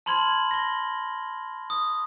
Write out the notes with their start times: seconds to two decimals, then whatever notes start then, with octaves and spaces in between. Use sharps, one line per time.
0.06 A5 B5 C6 F6 G#6 F#7
0.51 A#6 G7
1.70 D#6